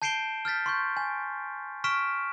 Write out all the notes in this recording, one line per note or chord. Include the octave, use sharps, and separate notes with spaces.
A5 G6 C7 D7 E7 G7
F6 G6 A6 B6
C6 C#6 G6
G#5
C#6 F6 B6 D7 E7